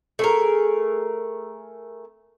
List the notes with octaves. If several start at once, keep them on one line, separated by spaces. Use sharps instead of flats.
A3 G#4 A#4